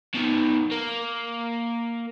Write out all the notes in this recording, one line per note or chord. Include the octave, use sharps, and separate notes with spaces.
B2 D#3
A#3